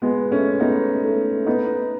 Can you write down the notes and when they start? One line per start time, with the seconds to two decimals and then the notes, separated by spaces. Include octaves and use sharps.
0.02 G#3 B3
0.31 A3 C#4
0.60 B3 D#4
1.04 A3
1.47 B3 D#4